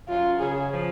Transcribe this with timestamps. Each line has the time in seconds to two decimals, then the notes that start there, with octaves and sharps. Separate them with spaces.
0.08 F#2 F4
0.40 C#3 G#4
0.73 F3